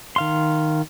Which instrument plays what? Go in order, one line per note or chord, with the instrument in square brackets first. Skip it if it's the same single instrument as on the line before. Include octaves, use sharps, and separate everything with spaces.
[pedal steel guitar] D#3 F5 C6